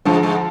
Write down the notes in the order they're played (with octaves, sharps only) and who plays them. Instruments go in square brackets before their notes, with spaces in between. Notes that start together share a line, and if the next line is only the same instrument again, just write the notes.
[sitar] G#2 G#3 [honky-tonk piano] D3 F3
[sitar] G#2 G#3